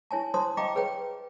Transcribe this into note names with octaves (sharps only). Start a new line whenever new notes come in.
E4 C#5 G#5 A5
C5 C#5 A5 C6 D#6
D#5 F5 G5 A#5 D6
G#4 B4 C#5 G5